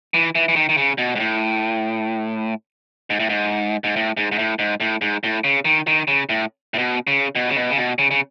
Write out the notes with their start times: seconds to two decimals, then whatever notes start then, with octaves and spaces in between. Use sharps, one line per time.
0.14 E3
0.35 E3
0.48 E3
0.56 D#3
0.69 D#3
0.77 C#3
0.98 B2
1.16 G#2
1.20 A2
3.10 G#2
3.20 A2
3.29 G#2
3.84 G#2
3.96 A2
4.17 G#2
4.32 G#2
4.39 A2
4.59 G#2
4.80 A2
5.01 G#2
5.24 A2
5.44 C#3
5.65 D#3
5.87 D#3
6.08 C#3
6.29 A2
6.74 A2
6.78 B2
7.07 C#3
7.35 B2
7.49 C#3
7.56 B2
7.71 C#3
7.77 B2
7.99 C#3
8.11 C#3